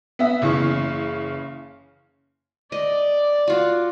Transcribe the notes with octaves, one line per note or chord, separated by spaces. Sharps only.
B3 E5 B6
F#1 C#3 E3 C#6
D5 D#5
F4 F#4